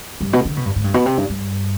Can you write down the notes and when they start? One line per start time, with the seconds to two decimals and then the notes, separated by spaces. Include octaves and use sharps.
0.21 G2
0.33 B2
0.45 D3
0.57 B2
0.66 G2
0.76 G#2
0.84 G2
0.94 B2
1.06 C3
1.17 G2
1.30 G2